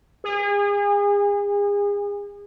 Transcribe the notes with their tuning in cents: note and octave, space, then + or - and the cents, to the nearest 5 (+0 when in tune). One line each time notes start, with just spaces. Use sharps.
G#4 -35